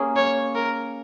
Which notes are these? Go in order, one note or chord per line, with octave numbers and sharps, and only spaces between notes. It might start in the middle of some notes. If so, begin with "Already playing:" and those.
Already playing: A#3 C#4 G#4
C#5
A#4